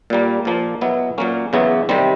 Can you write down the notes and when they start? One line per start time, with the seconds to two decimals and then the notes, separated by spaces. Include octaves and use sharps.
0.10 A#2 G3 A#3
0.45 A#2 F3 A#3
0.81 B2 F#3 B3 E4
1.18 A#2 F#3 A#3 C#4
1.53 E2 C#3 F#3 B3 E4
1.89 C3 D#3 G3 C4